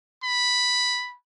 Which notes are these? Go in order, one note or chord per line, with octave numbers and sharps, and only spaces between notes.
B5